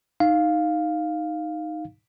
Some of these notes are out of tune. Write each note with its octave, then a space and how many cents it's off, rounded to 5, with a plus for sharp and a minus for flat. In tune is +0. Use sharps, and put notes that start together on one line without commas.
D#4 +0 F5 +5